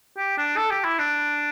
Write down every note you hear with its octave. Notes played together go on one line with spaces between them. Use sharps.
G4
D4
A4
G4
E4
D4